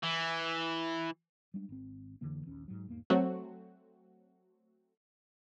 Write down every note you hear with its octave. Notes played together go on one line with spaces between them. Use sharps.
E3
G3 G#3 D4
G#1 C4
F2 D3 E3 A#3
A#1 D#2 C#4
G#2 F#3
G1 E2 G#2 A#3
F#3 A3 C4 F#4